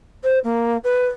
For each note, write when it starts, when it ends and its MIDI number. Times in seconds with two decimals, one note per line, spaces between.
0.24 0.38 72
0.44 0.77 58
0.84 1.06 71